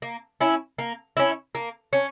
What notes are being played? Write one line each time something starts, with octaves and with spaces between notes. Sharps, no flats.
A#3
C#4 E4
A#3
C#4 E4
A#3
C#4